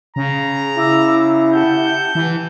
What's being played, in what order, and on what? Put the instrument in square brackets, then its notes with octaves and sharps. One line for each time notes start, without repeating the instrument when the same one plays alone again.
[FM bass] C#3 [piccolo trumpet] A#5
[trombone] E4 [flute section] D6 E6
[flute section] G4 F#5 A5 [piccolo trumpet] G6
[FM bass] E3